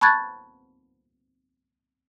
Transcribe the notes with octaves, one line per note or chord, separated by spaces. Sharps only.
A5 B5 C#6 F#6 G#6 A6